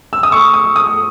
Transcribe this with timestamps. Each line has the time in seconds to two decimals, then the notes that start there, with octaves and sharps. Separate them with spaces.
0.13 E6
0.23 D#6
0.32 A3 C#6
0.54 D#6
0.76 A3 D#6